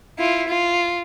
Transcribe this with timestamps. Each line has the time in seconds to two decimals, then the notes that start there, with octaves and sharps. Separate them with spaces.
0.18 E4 F4
0.48 F4